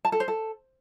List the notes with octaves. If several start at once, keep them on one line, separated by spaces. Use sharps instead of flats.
A5
A4
C5
A4